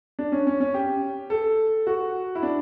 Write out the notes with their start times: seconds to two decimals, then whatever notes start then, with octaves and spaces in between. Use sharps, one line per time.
0.19 D4
0.32 C#4
0.47 C#4
0.60 C#4
0.74 G4
1.30 A4
1.87 F#4
2.35 E4
2.43 D4